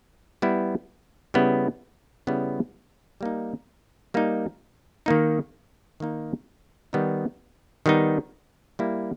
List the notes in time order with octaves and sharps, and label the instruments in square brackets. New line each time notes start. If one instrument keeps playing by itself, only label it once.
[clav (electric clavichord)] G3 B3 E4
C#3 G3 B3 E4
C#3 G3 B3 E4
G3 A#3 D#4
G3 A#3 D#4
D#3 A#3 D#4
D#3 A#3 D#4
D#3 G3 B3 D#4
D#3 G3 B3 D#4
G3 A#3 E4